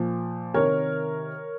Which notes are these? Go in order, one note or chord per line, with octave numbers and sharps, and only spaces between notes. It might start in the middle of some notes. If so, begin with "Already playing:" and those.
Already playing: A#2 F3
C3 D#3 A#4 C#5